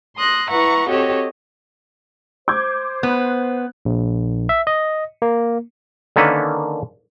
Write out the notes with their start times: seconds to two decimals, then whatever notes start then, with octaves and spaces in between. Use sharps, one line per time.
0.17 C6 D#6 F#6 A#6
0.50 E4 B4 E5 F#5 A#5 C#6
0.89 C4 F#4 G4 A4 C#5 D#5
2.48 C5 D6 G6 G#6
3.03 B3 F#6
3.85 A#1
4.49 E5
4.67 D#5
5.22 A#3
6.16 D3 D#3 A#3 C#4 A4 B4